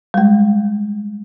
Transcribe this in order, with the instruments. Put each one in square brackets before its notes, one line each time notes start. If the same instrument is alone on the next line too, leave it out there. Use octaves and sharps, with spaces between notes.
[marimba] G3 G#3